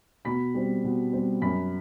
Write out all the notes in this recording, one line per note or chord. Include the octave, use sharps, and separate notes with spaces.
B2 B5 B6
G3 C4
B2
G3 C4
F#2 B5 B6